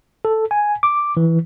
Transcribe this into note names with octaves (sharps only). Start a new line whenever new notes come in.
A4
G#5
D6
E3